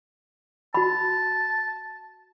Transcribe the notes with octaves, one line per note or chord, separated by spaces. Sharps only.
F#4 A5 B5